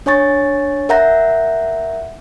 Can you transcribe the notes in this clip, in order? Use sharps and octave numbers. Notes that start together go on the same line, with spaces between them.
D4 C#5 G#5 C#6 A6
A#4 E5 F#5 A#5 G6 A#6